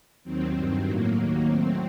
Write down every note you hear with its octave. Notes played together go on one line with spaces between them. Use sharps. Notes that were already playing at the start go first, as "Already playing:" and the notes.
D#2 D#3 F#3 C4
G2 D#3 F#3 C4
A2 F#3 A#3
D#2 D#3 F#3
A2 F#3 C4